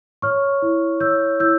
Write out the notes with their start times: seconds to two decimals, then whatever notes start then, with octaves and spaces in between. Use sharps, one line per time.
0.22 C#5 C#6 F6
0.62 E4
1.00 C#5 E6 G6
1.40 E4 E6 G6